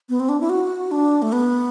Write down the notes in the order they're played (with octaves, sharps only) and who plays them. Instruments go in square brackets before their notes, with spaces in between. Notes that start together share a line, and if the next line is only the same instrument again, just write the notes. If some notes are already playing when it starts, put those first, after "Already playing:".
[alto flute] B3
C4
D4
E4
F#4
D4
A3
B3